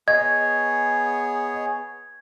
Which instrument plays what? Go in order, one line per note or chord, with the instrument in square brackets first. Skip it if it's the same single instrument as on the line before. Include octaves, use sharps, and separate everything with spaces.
[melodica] B3 G#4 C#5 [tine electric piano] D#5 [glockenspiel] G#6